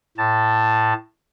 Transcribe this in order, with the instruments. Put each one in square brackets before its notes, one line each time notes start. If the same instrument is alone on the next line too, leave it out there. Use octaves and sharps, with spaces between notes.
[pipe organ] A2 A5